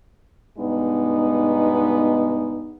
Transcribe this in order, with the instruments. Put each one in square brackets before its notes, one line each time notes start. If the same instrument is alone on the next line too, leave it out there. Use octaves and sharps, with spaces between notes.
[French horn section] G2 B2 G#3 B3 D#4